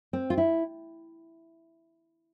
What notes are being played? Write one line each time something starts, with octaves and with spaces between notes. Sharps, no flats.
C4
F4
E4